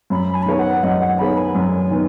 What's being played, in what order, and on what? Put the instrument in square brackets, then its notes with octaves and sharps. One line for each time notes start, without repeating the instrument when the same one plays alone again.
[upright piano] F#2 [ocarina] B5
[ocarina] G#5
B5
[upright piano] D#3 B3 G#4 C#5 [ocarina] G#5
[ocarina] F#5
[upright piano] F#2 [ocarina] D#5
[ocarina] F#5
[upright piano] D#3 B3 G#4 C#5 [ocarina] B5
[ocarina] G#5
[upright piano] F#2
D#3 B3